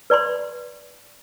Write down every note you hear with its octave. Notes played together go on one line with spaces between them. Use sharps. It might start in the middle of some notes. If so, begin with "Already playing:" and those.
B4 D5 B5 C6